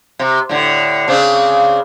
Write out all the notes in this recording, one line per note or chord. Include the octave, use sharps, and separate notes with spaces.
C3
A2 D3
C#3 C4 D4